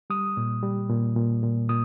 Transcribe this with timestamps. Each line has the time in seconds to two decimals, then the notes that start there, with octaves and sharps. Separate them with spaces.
0.10 G3 D#6
0.37 A#2
0.63 G3
0.90 A#2
1.16 A#2
1.43 A#2
1.69 A#2 D#6